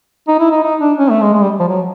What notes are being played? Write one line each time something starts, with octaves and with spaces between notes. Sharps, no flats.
D#4
E4
D#4
D#4
D4
C#4
A3
G#3
G#3
G3
F3
F#3